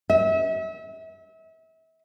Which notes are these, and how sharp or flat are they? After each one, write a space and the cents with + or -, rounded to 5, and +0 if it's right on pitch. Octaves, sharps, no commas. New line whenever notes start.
E5 -35